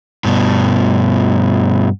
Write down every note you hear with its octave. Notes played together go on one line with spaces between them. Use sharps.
G2 B2